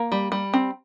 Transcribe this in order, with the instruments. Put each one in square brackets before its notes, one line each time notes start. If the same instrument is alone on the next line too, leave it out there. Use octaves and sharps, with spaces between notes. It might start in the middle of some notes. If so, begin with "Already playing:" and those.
Already playing: [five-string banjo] A#3
G3
G3
C4